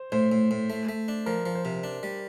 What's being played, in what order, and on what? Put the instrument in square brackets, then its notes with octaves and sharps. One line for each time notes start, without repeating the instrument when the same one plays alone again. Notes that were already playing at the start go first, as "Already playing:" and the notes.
Already playing: [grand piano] C5
[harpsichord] A2 [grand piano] C5
[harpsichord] A2
A2
A3
A3
D4
[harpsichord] F3 [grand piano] A#4
[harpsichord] F3
[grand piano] C5
[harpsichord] C3
D4
G3